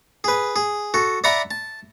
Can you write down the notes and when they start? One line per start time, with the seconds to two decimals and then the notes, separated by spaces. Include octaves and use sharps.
0.24 G#4 B4
0.56 G#4
0.94 F#4 A4
1.24 D5 E5 F#5 A#5 B5 D6
1.51 A5